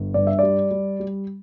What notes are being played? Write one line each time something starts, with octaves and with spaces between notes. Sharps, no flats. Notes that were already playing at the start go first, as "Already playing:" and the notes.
Already playing: G1
G2 D5
E5
G3 D5
G3
G3